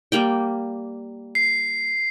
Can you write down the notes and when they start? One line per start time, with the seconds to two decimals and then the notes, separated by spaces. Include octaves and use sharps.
0.12 G3 A#3 G5
1.35 C7